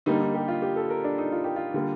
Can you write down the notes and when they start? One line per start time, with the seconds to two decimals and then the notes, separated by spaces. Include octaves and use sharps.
0.06 D3 G3 A#3 D#4
0.20 D#4
0.34 G4
0.48 F4
0.62 G4
0.76 A4
0.90 A#4
1.04 D4
1.18 D#4
1.32 F4
1.44 G4
1.56 F4
1.74 D3 G3 A#3